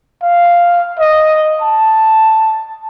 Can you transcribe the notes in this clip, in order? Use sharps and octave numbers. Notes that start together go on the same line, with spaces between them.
F5
D#5
A5